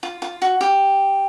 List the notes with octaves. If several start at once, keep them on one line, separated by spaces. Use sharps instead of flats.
F4
F4
F#4
G4